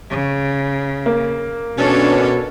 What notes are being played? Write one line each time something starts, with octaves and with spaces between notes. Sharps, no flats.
C#3
A#3
B2 C#4 D4 A4 C#5